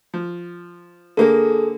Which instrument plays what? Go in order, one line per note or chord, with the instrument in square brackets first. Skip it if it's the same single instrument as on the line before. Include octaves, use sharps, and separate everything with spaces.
[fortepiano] F3
[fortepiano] D3 A#3 [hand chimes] G#4 A4